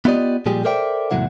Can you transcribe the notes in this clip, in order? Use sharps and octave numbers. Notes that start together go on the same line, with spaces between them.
B3 E4 F4 G4 D5 D#5
A#2 F3 G3 G#3 G4 G#4
A4 A#4 C5 D5 E5 G5
E2 A2 C3 F#3 E4 F#5